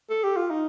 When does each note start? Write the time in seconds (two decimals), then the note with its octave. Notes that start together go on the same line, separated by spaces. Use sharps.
0.09 A4
0.23 G4
0.36 F4
0.50 D#4